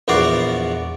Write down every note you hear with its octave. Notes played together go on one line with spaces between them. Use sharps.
A#1 E2 F#4 D5 F5